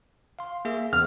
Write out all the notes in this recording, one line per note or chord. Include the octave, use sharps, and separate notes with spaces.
F5 C6
A#3 G#4 E5
E2 F6